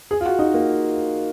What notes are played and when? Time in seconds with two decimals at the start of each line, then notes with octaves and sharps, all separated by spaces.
0.11 G#4
0.21 F4
0.26 F#4
0.39 D#4
0.54 A#3